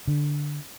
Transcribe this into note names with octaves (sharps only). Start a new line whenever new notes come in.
D3